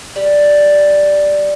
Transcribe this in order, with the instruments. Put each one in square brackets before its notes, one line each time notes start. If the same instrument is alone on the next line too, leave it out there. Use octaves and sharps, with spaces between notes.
[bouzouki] G3